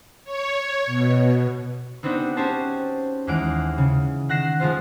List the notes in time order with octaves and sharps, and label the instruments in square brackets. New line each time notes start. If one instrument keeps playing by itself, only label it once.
[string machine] C#5
B2
[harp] B3 C4 D4 D#4 F#4 G4
C#4 F#4 G4 C5 A5
D#2 E3 G#3 F#5 F6 D7
C#3
D#3 F#5 F#6 A#6 C7 E7
F3 G#3 F4 C5